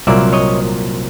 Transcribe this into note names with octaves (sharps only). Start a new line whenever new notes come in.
C2 A#2 F#3 A#3 D5 E5
C#5 D#5